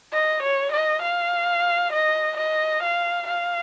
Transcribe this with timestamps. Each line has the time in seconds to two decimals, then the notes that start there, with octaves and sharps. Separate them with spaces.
0.12 D#5
0.43 C#5
0.72 D#5
1.02 F5
1.92 D#5
2.37 D#5
2.83 F5
3.27 F5